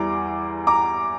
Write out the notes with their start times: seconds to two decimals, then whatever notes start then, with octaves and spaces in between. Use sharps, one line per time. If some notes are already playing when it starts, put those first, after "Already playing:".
Already playing: E2 E3 G3 A#5 D6
0.67 A#5 D6